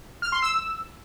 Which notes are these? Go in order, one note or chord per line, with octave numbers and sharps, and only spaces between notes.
F6
C6
E6